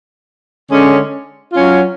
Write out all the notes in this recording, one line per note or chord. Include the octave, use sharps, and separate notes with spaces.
D3 G#3 C#4
F#3 C#4 F4